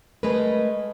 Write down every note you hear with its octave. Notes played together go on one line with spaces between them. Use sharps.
G#3 A3 A#4 B4